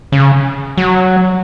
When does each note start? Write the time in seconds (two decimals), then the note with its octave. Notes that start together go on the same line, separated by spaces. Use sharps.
0.12 C#3
0.78 F#3